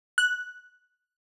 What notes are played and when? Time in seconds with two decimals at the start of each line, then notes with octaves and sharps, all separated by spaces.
0.18 F#6